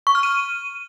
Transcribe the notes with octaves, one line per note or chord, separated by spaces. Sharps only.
C#6
F6
D#7